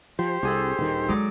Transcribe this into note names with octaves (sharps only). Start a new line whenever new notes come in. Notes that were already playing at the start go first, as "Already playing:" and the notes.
F3 G4 C5
C2 D4 G#4 A4
D#1 D#3
F#3 G#3 D#4 D5